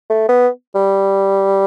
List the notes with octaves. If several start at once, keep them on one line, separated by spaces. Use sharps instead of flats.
A3
B3
G3